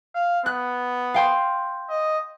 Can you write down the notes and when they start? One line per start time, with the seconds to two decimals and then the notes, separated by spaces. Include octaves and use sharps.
0.15 F5
0.46 B3 F#6
1.14 F5 G5 C6
1.90 D#5